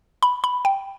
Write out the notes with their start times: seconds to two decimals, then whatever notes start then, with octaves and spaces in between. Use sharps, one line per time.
0.23 B5
0.44 B5
0.65 G5